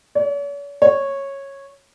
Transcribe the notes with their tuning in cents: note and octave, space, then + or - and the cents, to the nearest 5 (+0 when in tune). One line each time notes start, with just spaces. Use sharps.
C#5 +45
C#5 -10